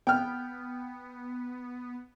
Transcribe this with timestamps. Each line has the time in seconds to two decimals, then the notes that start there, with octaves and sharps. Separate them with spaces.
0.07 B3 G5 F6